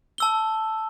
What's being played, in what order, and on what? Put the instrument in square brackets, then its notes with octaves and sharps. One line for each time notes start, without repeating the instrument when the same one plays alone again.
[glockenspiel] A5 E6 G7